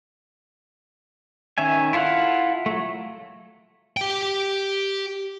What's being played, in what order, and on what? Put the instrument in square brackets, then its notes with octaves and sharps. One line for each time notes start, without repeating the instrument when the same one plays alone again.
[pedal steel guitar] D#3 C#4 E5 G#5
E4 F4 A4 F5 F#5
F#3 A3
[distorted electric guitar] G4 G5